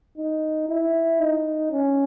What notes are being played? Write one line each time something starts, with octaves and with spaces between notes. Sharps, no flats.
D#4
E4
D#4
C#4